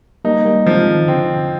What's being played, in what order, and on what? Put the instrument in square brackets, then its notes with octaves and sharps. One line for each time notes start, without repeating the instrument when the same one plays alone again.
[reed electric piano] G3 A#3 [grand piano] D#4
[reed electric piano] G3 A#3
[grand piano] F3 [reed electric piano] G#3 C4
[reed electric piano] D#3
[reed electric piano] D3 [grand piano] C4
[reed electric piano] D3